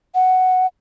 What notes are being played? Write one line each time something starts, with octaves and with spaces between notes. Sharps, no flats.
F#5